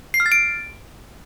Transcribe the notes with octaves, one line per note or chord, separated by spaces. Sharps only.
C7
F6
A6
D7